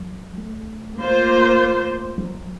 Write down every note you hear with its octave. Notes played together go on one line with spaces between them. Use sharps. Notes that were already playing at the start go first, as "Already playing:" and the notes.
Already playing: F#3
A3
A3 A#3 F4 C5
F#3